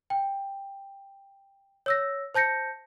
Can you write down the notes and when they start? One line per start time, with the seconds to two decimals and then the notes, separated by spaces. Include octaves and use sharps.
0.10 G5
1.86 C#5 E6 A#6
2.35 C5 A5 G6 A#6 C#7